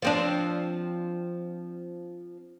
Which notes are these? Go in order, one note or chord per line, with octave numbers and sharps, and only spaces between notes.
F3 C4 D4